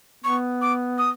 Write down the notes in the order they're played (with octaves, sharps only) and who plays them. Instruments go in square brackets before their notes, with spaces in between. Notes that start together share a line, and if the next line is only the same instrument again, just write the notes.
[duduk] B3 [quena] C#6
[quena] D6
D#6